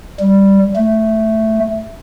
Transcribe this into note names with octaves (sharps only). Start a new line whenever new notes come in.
G3
A3